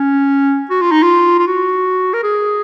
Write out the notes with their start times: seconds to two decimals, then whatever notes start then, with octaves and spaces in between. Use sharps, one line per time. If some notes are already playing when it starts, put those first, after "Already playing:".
Already playing: C#4
0.70 F#4
0.81 F4
0.92 D#4
1.03 F4
1.38 F4
1.47 F#4
2.14 A#4
2.24 G#4